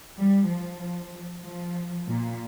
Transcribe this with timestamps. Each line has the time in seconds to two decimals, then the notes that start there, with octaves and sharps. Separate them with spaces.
0.17 G3
0.49 F3
1.44 F3
2.08 A#2